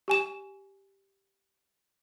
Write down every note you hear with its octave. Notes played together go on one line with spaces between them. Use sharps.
G4 G#5 E7